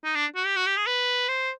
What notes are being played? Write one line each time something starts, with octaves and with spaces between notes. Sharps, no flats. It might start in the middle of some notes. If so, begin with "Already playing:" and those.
D#4
D4
F#4
G4
F#4
G4
G#4
B4
C5